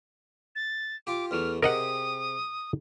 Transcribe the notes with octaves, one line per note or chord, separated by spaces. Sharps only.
A6
F4 G4 D6
E2 E3 A3 F6
C3 G4 G#4 A#4 D#5 F#5 D#6